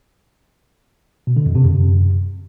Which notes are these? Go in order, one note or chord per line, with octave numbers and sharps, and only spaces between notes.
B2
D3
F2
C3
F#2